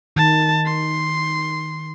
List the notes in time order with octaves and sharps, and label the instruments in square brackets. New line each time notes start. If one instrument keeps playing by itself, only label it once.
[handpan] D#3 [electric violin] A5
[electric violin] C6